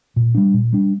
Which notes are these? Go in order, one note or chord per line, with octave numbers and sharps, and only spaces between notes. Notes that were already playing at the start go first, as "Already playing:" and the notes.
A#2
G3 D4
A#2
G3 D4